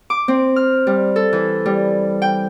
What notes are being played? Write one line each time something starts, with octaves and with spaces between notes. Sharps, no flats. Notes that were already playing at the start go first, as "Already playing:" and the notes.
D6
C4
F6
G3
A4
E3
G3
G5